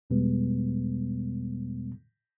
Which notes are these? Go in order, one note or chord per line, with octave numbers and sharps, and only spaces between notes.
E2 B2 G3 G#3 B3